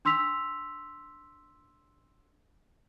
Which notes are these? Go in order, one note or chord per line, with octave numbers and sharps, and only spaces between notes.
D4 C6 E6 B6 F7